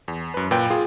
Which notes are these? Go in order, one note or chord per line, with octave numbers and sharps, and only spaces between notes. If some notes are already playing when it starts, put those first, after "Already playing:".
E2
F#2 B4
A#2 B4 G5
F4 G#4